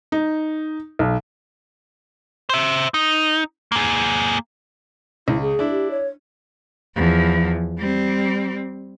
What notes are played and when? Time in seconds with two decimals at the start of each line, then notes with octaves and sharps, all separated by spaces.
0.12 D#4
0.99 B1
2.49 C5 E5
2.94 D#4
3.72 A#3 G#4
5.28 C#2 E4
5.41 G#4
5.59 D4 E4
5.70 G4
5.91 C#5
6.96 E2 F3
7.78 G3 C4